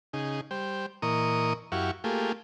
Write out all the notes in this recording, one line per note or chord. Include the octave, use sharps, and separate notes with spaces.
C#3 D#4 G#4
G3 C5 G5
A#2 E3 A#4 D#5 C#6 D#6
F#2 E4 F#4 G4 F5 C#6
A3 A#3 F4 G4 G#4